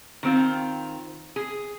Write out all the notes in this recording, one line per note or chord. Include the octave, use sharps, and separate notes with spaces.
D#3 C4 F4
G#4